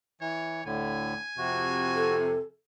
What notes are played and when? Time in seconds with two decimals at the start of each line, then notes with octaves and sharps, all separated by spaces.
0.21 E3 C#5
0.66 D2 A2 D3 G#5
1.38 F2 C3 F#4
1.95 A4